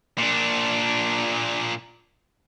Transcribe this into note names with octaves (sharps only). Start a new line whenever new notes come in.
A#2 D4